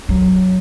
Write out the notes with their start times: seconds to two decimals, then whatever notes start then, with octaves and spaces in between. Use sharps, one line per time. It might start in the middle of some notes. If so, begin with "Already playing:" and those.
0.09 F#3